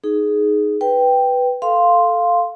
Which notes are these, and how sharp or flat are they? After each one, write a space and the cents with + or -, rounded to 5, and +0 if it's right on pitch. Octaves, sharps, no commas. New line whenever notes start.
D#4 -5 G#4 +15
B4 +0 G5 +0
A4 +0 F5 +0 C6 +0